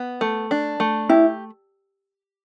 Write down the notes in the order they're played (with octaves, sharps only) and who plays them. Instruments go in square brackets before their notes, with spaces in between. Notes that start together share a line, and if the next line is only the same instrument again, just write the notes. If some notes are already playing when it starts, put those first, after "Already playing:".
Already playing: [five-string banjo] B3
A3
D4
A3
[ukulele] E4 [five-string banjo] G4